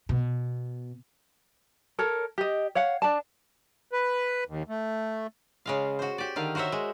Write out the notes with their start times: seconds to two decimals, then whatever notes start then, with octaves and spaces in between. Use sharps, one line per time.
0.09 B2
1.99 A4 A#4 C#5
2.38 G4 D#5
2.75 C#5 F5 F#5
3.02 D4 A5
3.92 B4
4.47 D#2
4.69 A3
5.66 C#3 G#3 F5
5.99 F#4 C5
6.18 G4 D5
6.36 D3 D#3 F5
6.55 F#4 A#4 C5 C#5 E5
6.72 G#3